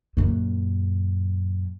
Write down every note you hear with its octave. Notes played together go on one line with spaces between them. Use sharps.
F#2 A#2